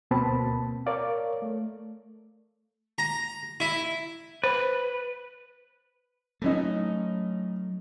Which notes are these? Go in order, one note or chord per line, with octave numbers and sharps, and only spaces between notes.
D2 B2 A#3 C4 A5 B5
A#4 C#5 D5 F5
A3
A#5
E4
B4 C5
A2 F#3 A3 C#4 D#4